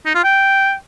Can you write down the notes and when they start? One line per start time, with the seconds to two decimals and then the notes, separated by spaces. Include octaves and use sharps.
0.06 D#4
0.15 F4
0.24 G5